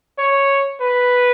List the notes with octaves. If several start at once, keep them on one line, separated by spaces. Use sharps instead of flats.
C#5
B4